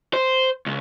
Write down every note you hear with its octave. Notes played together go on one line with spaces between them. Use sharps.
C5
C#2